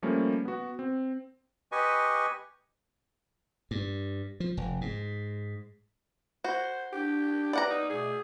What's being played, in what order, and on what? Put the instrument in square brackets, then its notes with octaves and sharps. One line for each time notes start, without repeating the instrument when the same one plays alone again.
[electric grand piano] F3 G3 A3 A#3 C#4
B3 F#4
C4
[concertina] G4 B4 D#5 G#5 C#6
[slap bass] G2
F3
F1
G#2
[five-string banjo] F#4 [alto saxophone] C5
[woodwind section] D4 [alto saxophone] G4
[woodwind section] A#4 B4 [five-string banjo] D5 F#5 A#5
[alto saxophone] D#4
[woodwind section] B2 A3 [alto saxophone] G#4